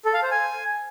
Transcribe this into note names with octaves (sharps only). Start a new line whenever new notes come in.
A4
F5
C5
G#5